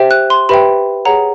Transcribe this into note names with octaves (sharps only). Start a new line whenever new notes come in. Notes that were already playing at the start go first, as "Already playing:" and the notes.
Already playing: G4 C5 E5 G5
F#6
C6
G4 B4 E5 G5 B5
G#4 C#5 F#5 A#5